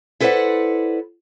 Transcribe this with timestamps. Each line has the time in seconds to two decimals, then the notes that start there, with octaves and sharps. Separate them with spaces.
0.20 E4 A4 B4 C5 D5 F#5